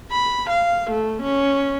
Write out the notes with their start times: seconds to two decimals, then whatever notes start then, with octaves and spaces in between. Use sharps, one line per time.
0.11 B5
0.50 F5
0.91 A3
1.22 C#4